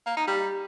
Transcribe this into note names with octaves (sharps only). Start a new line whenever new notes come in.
A#3
D#4
G3